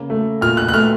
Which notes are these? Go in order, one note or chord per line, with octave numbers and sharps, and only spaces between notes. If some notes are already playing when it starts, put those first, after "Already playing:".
Already playing: C#3 A#3
A3
A#2 F6
F#6
F#6
A3 F6